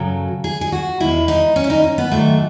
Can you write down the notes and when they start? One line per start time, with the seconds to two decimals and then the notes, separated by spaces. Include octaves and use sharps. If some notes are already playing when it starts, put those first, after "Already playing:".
Already playing: F#2 C#3 F#3 A4
0.44 G#4
0.61 G#4
0.72 F#4
1.00 E2 B2 G#3 E4
1.28 D#4
1.56 C#4
1.64 E4
1.70 D#4
1.84 C#4
1.98 B3
2.12 G#2 D#3 F#3 A3